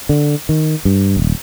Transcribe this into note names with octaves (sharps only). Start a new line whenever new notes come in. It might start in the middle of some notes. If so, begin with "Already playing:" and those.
D3
D#3
G2
D#1